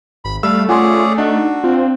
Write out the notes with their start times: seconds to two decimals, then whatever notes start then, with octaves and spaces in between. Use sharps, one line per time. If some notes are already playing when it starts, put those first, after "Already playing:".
0.25 G#1 B5
0.43 G3 A3 F5 B5 E6
0.69 C#4 F4 G#4 D5 F#5 G#5 C6
1.18 D4 D#4 F#4
1.64 C4 F4